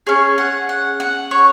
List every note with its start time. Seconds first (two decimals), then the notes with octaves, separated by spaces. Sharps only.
0.07 C#4 G#4 C#5
0.38 F#5
0.69 F#5
1.00 F#5
1.31 C#5